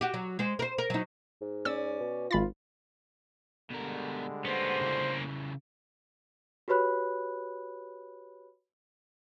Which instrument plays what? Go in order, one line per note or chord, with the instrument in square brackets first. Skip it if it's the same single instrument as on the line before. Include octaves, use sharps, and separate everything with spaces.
[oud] F#4 G4
F#3
G#3 C5
A#4 C5
A#4
F#3 D#4
[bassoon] G#2
[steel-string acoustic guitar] C#4 D5 [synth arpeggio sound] E6
[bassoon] B2
[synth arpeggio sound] G#1 B5 A6 [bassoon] F4
[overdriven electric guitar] B2 A#4 [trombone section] D3 G3 G#3
[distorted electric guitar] A#3 C#4 [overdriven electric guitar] B3 [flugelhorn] C5
[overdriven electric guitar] C#3 E3
[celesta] F#4 G4 B4 C#5 B5 F#6